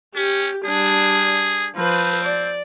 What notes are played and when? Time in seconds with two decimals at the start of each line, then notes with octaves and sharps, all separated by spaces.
0.15 C#4 G4
0.65 G3 D4 G#4
1.76 F3 C4 B4
2.24 D5